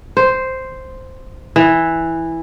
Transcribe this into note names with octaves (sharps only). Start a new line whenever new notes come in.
C5
E3